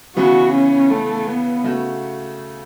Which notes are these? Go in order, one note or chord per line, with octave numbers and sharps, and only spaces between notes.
C#3 E3 B3 F#4
C#4
A3
B3
C#3 A3 F#4